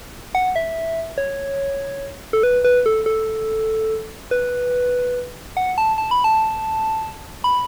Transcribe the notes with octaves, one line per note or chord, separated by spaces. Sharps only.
F#5
E5
C#5
A4
B4
B4
A4
A4
B4
F#5
A5
A5
B5
A5
B5